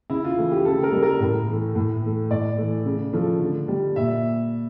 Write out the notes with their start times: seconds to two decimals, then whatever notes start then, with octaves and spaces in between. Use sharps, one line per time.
0.10 C#3 E4
0.24 F4
0.38 E3 A3
0.52 G4
0.65 C#3 A4
0.83 A#4
0.92 G3
1.03 A#4
1.20 A2
1.48 E3 A3
1.75 A2
2.02 E3 A3
2.31 A2 D5
2.58 E3 A3
2.86 C#3
3.13 F3 A3
3.40 D3
3.68 G3
3.96 A#2 E5